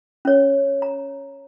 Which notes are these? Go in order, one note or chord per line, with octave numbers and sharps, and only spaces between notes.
C#4 C#5
A#5